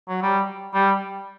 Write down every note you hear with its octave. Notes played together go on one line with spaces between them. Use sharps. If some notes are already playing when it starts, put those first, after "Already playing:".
F#3
G3
G3